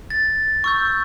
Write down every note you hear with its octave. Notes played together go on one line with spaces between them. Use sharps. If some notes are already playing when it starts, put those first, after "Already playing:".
A6
C#6 E6 G6